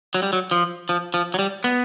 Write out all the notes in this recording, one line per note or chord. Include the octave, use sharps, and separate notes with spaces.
F#3
G3
F#3
F3
F3
F3
F#3
G3
B3